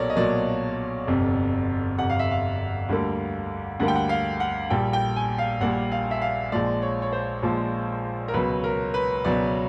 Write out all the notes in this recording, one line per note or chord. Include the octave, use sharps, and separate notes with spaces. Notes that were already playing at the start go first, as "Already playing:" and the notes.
Already playing: B1 A#2 F#3 A4 A#4 C#5 D5
D#5
B1 A#2 F#3 A#3 D5
G1 F2 C3
G1 F2 C3 F#5
F5
E5
F5
D2 D3 G3 A#3
D2 D3 G3 A#3 F#5
G5
F#5
F5
F#5
A#1 A#2 G3 G5
G5
G#5
F5
A#1 A#2 G3 F#5
F5
E5
F5
A#1 A#2 F3 G#3 D5
C#5
C#5
C5
A#1 A#2 F3 G#3
A#4
C#2 B2 F#3 B4
A#4
B4
C#2 B2 F#3 D5